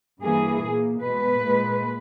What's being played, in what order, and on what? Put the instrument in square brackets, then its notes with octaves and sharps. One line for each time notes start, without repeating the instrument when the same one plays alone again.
[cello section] G2 E3 A#3 G#4
A#2 A#3
B2 G#3 B4
A#2 G#3